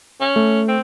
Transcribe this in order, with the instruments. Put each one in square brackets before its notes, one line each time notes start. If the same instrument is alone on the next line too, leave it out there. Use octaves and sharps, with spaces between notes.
[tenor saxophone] C#4
[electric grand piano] A3
[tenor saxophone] C4